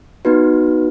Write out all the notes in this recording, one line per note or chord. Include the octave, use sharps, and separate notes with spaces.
B3 D#4 F#4 B4